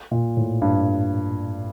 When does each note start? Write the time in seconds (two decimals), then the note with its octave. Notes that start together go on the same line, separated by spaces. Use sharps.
0.11 A#2
0.37 A2
0.62 G2